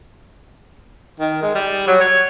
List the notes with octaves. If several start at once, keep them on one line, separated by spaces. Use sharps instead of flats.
D#3
G#3
G3
F#3
C#5